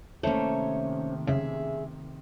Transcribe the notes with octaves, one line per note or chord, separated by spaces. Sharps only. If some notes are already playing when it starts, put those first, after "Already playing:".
C3 D#3 A3 A#3 C#4 C5 C#5
C#3 G#4 E5